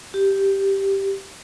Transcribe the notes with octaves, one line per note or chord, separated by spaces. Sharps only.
G4